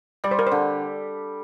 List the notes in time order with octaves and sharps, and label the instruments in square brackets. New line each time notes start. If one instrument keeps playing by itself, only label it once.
[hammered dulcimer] G3 [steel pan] D5
[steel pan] C5
A#4
[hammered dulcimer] D3 [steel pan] C5